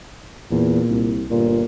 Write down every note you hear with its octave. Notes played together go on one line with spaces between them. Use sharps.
E2 A#2
C2
G1 A#2